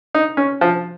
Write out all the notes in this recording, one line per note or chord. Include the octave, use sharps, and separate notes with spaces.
D#4
C#4
F3